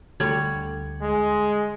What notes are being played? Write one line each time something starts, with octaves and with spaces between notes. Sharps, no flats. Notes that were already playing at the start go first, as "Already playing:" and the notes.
D2 D3 G3 C#5
G#3